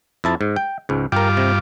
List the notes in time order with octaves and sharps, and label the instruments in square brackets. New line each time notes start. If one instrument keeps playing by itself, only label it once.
[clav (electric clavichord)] F2 E4 A5
G#2
G5
C#2 G#2
[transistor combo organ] G2 F4 D6 [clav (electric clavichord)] A#4 G5
[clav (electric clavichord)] C3